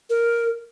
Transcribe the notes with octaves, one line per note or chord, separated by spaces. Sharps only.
A#4